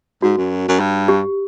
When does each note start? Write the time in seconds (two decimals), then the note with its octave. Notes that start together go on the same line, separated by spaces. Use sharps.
0.22 G#2 F#4
0.37 F#2
0.68 F#2
0.80 G2
1.08 G4